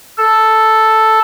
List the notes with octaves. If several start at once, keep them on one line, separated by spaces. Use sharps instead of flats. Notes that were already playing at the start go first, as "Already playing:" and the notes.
A4